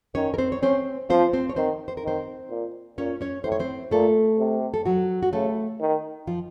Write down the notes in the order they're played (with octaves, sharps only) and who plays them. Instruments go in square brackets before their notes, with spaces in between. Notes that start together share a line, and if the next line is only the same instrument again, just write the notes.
[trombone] D#3 [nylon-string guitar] C#4 C#5
[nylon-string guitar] A#4
C4 C5
C#5
[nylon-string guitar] C4 C5 [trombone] C#4
[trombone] F3 [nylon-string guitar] C4 C5
[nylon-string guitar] C4 C5
C#5
[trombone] D#3 [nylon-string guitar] C4 C5
[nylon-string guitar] C5
A#4
[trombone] D#3 [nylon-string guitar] C4 C5
[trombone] A#2
[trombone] A#2 [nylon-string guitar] C#4 C#5
[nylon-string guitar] C#4 C#5
[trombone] A2 [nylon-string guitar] C5
[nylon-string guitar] C#5
C4 C5
[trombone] A#2 [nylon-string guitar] A3 A4
[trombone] C3
[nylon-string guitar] A4
F#3 F#4
F#4
[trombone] C#3 [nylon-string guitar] A3 A4
[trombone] D#3
[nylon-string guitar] F3 F4